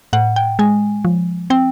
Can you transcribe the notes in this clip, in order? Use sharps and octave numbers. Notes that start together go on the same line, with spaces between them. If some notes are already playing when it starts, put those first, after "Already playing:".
A2 F#5
G5
G#3 G#5
F3
C4 G5